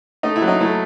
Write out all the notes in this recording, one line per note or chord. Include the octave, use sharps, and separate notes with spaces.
A3 D#4
E4
F#3
D#4
A3 E4